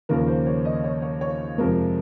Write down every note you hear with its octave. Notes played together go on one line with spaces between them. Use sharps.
D#2 C#3 F3 A#4
C5
C#5
D#5
C#5
C#5
C#5
F2 C3 F3 G#3 A#4